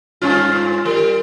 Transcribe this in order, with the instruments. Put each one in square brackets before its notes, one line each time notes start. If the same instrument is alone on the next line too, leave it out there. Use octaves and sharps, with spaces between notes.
[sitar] G2 C#4 F4
[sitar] G3 [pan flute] A#4